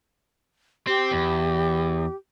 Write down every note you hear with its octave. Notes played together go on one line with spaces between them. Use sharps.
C4 G4
E2